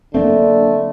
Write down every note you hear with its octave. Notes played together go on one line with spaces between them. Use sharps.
D3 F#3 A3 A#3 C4